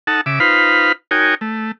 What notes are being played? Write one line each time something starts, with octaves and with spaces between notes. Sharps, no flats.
D#4 A4 F#5 A5
C#3 E5 D6
D#4 F4 B4 C5 F5 B5
D#4 F#4 A#4 C#5 G5 G#5
A3